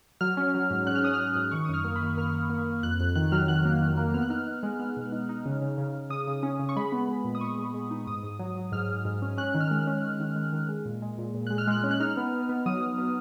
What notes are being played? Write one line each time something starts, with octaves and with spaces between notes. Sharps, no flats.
F#3 F6
C#4
F#3
G#2
C#4 F#6
F6
C#4 D#6
F6
C#4
G#2
D#3 C#6
D#6
F#2 F6
A#3
B5
D#3
A#3 F6
A#3
A#3
A#3
F2 F#6
F2 F#6
D#3 F#6
F#3 F6
D#3 F#6
A#3
D#3
A#3
B3 F6
F#6
D#4 F6
D#4
G#3
B3 F6
B2
D#4
D#4
C#3
C#3
C#3
C#3
C#3 D#6
C#3
C#4
C#3
C#6
G#3 B5
B3
G#3
A#2
D#6
A#2 C#6
G#3
G#3
D#4
G#2 D#6
G#2
F#3
F#3
G#2 F6
G#2
G#2
C#4
C#4 F#6
D#3
F6
G#3
C#4
C#4
D#3
G#3
D#3
G#3
A#2
G#3
A#2
A#2
G#3 F#6
F6
G#3 F#6
C#4
F#6
D#4 F6
B3
B3
B3
F#3 D#6
F#3
B3